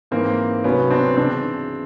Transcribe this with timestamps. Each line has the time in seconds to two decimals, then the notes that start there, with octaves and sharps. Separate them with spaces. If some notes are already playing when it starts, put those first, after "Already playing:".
0.11 G#2 E3 A#3 C4
0.64 C2 B2 F#3 B3 C#4
0.91 C4 D4
1.17 C#3 E3 C4 D4